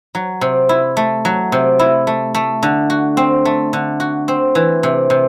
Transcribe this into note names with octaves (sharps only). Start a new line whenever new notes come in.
F#3
C3
E4
A3
F#3
C3
E4
A3
A3
D3
F#4
C4
A3
D3
F#4
C4
E3
C3
C3